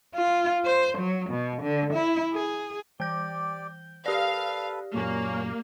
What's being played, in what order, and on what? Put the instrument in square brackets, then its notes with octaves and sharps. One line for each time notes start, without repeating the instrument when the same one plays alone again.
[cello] F4
C5
F#3
B2
D3
E4
G#4
[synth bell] E3 G6 [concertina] G4 D5 [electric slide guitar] G5
[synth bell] G4 D5 [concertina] A4 B4 [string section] F5
[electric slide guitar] F#2 A#2 [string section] A#3 [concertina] C#4